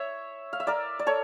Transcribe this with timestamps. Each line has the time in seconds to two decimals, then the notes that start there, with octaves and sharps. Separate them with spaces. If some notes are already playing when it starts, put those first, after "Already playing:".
Already playing: C#5 E5
0.53 F5
0.60 E5
0.67 A#4 D5
0.99 D5
1.07 A4 C#5